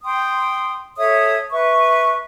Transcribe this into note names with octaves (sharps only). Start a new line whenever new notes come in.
G5 C6 D#6
A4 C#5 E5 D#6
B4 E5 C#6